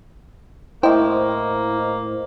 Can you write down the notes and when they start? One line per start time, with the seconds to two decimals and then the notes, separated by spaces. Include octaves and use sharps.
0.83 A2 A#3 E4 C5 D#5 G5